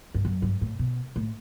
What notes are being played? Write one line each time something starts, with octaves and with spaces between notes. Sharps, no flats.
G2
F#2
G2
A2
B2
A2